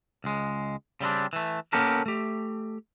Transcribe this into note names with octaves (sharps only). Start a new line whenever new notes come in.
C#2 G#3
C#3 G3 C4 D4
E3 A3
A#3 B3 C#4 G4 A4 A#4
A3 G4